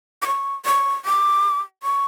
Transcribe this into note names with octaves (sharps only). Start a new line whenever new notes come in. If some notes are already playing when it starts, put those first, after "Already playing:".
D6
C#6
C#6
D6
C#6